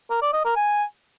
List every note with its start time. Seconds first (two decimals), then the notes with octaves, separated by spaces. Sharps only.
0.10 A#4
0.22 D5
0.33 D#5
0.45 A#4
0.56 G#5